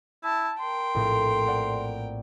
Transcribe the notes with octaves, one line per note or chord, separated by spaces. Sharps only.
E4 A5
A#4 G5 C6
A#1 A2 C4
C5 D5 F#5